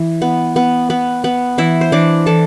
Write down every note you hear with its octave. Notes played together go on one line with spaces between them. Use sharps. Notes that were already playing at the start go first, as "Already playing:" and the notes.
Already playing: E3
B3
B3
B3
B3
E3 E4 E5
C5
E3 D4 D5
E3 A4 A5